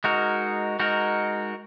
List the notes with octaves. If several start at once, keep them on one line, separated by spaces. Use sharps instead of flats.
G#3 D#4 F#4 A#4
G#3 D#4 F#4 A#4